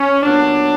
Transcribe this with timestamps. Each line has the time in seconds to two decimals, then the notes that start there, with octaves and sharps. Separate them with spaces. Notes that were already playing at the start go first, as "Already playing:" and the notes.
Already playing: C#4
0.23 A#2 F#3 B3 D4